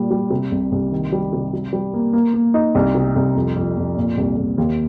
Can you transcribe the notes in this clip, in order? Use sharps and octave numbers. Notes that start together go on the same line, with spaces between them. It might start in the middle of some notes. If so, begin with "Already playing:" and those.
Already playing: A#2 G3
G3
C3
C2
C2
D#3
G3
C3
G3
G3
A#3
A#3
A#3
D#4
C2
C3
C2
F2
F2
F2
A#2
C2
C2
D#2